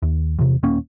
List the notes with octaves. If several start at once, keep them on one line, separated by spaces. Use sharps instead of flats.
D#2
E2 C3
D#1 A#3 C#4